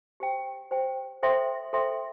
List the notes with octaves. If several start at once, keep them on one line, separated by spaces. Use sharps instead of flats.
G4 C5 G5
G4 C5 G5
A4 C5 E5 G5 C6
A4 C5 E5 G5 C6